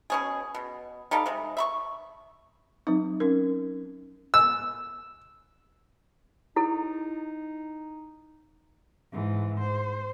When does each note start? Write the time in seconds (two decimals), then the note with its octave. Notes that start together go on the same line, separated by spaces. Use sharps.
0.10 B2 C#4 G#4
0.55 B2
1.11 G3 D#4 A4 F5
1.26 C3 G#3
1.57 E5 B5 C#6
2.87 F#3 C4 D#4
3.20 C#4 A#4
4.34 E6
6.56 D#4 E4 A4
9.12 G#2 E3
9.60 C5